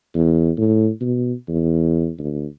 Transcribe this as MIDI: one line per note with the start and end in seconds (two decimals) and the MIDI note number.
0.15 0.51 40
0.57 0.89 45
1.01 1.33 47
1.48 2.11 40
2.18 2.46 38